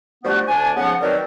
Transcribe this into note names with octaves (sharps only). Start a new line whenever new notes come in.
F3 G3 A3 B3 D4 F#4
D2 D4 G#5
G#2 C#3 F3 B3 F#5
D#3 F#3 C4 A#4 B4 D5